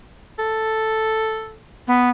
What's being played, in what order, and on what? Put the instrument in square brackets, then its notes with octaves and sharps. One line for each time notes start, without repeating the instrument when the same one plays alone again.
[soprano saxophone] A4
[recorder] B3